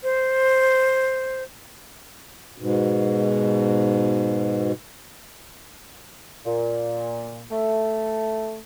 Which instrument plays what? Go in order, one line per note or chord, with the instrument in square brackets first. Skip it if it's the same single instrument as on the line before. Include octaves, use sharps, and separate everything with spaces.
[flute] C5
[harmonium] G#2 B2
[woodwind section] A#2
A3